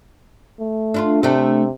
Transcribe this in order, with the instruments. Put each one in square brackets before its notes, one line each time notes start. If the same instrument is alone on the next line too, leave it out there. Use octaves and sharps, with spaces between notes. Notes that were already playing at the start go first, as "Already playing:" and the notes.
[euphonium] A3
[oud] D4 E4 F4
[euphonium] C3 [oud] A3 D4